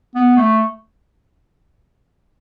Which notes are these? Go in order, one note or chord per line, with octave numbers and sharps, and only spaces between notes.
B3
A3